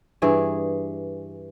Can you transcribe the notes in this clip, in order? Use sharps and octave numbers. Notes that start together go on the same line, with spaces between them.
G2 E3 G#4 D5